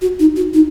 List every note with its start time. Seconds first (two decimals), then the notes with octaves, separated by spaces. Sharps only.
0.02 F#4
0.19 D#4
0.36 F#4
0.54 D#4